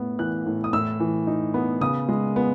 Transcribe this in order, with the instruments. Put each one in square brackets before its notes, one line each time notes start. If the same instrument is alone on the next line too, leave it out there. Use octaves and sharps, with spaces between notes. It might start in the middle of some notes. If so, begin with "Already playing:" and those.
Already playing: [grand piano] A2 B3
E3 F#6
A2
D#6
A2 E6
E3
D#4
B3
C#3 D#6
G#3
B3